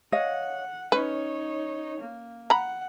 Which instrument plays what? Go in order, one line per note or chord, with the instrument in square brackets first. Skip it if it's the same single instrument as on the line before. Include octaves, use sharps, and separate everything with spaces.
[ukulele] C#5 D#5 F5 [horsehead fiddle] F#5
[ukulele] C#4 [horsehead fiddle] D#4 C#5 [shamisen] B4
[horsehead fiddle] A#3
[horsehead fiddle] F#5 [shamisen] A#5 B5